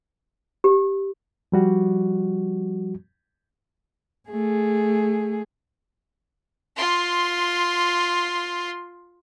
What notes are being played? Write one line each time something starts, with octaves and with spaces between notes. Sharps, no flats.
G4
F3 G3 F#4
A3 G#4
F4 C6